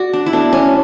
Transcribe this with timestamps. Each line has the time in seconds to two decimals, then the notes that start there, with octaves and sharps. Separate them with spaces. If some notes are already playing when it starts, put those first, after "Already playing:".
Already playing: F#4 D5
0.13 D4
0.26 E4
0.33 B2 A3 D4
0.53 C#4